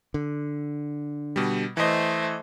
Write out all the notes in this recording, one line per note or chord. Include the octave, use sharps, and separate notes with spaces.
D3
B2 G3
E3 A3 C5 D#5